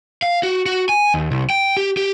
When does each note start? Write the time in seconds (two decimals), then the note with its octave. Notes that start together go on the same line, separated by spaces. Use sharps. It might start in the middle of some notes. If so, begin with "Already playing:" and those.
0.22 F5
0.43 F#4
0.66 F#4
0.89 G#5
1.14 D#2
1.31 C2
1.50 G5
1.77 G4
1.97 G4